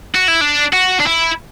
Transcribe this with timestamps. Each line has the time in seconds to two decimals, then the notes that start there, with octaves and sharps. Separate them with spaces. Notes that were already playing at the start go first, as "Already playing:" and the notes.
0.15 F#4
0.28 E4
0.41 D4
0.73 F#4
1.00 D4
1.07 E4